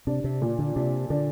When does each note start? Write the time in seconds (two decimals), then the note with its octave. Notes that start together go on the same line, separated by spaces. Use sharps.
0.07 C3 D4
0.24 C3
0.42 A#2
0.59 D3
0.76 C3 D4
1.10 D3 D4